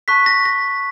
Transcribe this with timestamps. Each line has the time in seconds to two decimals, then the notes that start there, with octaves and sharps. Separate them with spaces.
0.08 A5 C#6 F#6 B6
0.26 A#6
0.45 A#6